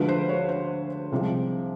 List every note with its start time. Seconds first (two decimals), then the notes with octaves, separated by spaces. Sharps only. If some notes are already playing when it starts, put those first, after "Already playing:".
Already playing: D2 D3 F3 G#3 B4
0.08 C5
0.29 C#5
0.49 C5
1.12 C2 C3 F3 G#3